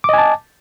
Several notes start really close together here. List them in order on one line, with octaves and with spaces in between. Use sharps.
D6 D#5 G#5 A5